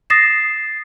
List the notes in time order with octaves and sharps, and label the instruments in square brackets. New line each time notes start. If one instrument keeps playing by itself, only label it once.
[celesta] D#6 A6 A#6 C7 E7